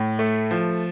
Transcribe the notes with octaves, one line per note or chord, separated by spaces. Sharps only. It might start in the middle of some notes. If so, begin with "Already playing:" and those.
Already playing: A2
A3
F3